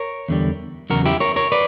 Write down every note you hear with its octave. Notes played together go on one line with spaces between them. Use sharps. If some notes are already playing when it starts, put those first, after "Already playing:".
Already playing: A#4 C#5
E2 D3 G3
E2 C#3 F#3 F#4 A#4
E4 G4
A#4 C#5
A#4 C#5
B4 D5